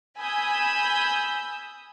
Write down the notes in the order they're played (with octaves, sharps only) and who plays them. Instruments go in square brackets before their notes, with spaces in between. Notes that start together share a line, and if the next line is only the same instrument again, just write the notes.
[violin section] G#5 B5 D#6 E6 G6